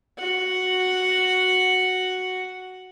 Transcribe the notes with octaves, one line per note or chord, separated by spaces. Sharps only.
F#4 F#5